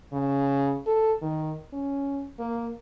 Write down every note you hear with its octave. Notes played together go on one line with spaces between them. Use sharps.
C#3
A4
D#3
C#4
A#3